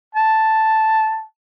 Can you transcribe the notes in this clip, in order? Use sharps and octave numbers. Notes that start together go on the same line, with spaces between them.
A5